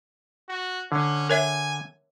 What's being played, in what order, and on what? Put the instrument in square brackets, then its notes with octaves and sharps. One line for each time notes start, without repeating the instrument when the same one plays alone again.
[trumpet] F#4
[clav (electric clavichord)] D3 [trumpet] C#4
[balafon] A#4 C#5 E5 [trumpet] G#5